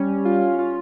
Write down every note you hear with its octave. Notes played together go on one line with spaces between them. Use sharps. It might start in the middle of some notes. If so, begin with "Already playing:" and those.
Already playing: G3 C#4
F4
F4